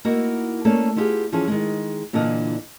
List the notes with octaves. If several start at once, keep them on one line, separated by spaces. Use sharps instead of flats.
A#3 D#4 E4 F#4
A3 A#3 C#4 A4 C#5 D5
B3 E4 F4 G4 G#4
E3 F3 C#4 F4 G#4 A4
D#3 G#3
A#2 D3 E3 D4 D#5 F5